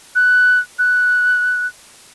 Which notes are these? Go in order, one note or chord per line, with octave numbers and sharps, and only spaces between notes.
F#6
F#6